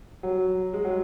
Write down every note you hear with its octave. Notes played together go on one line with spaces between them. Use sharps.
F#3
G#3
F#3